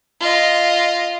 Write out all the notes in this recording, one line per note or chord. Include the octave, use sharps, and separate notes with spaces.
F4 D#5